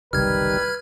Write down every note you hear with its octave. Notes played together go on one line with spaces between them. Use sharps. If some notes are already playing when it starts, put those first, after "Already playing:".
F#1 C2 D#3 G3 B4 F6 G#6